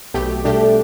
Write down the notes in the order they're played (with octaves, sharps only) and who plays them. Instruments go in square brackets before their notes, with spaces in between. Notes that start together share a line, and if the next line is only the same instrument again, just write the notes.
[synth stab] B1 B2 A3 G4
[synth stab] B2 G3 D4 G4 [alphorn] A3